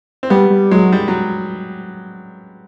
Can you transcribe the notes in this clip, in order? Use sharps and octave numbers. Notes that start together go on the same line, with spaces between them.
C4
G3 B3
G3
F#3 G#3
G3
F#3